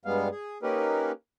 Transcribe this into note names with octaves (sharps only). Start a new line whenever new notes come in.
G2 G3 G#3 B3 F5
G#4
A#3 C#4 D#4 G4 A#4 B4